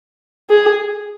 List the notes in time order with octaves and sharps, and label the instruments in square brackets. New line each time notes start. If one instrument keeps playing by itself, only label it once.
[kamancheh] G#4